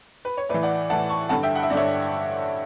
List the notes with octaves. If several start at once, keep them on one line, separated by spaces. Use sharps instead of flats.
B4
C#5
A2 E3 B4 D5
D5 F#5
A2 E3 F#5 A5
A5 C#6
G2 D3 F#5 A5
E5 G5
F#5
E5
G2 D3 C#5 D5 E5